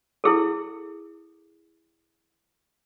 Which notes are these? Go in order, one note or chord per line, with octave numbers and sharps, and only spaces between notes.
E4 G#4 A4